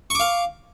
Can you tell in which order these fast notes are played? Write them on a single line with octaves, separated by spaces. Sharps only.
C#6 D6 F5